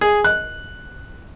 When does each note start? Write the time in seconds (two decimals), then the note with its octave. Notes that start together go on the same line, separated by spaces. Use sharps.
0.01 G#4
0.24 F#6